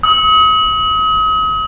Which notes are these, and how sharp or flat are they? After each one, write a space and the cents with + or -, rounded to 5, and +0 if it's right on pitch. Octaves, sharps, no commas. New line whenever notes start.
D#6 +40